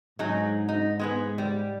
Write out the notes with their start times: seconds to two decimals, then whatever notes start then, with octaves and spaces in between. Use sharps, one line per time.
0.19 G#2 F#3 D#4 G#4
0.69 D#4
0.99 G#3 B3 G#4
1.38 G3